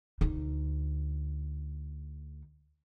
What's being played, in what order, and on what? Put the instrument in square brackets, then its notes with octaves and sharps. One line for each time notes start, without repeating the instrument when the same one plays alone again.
[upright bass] D2 D#4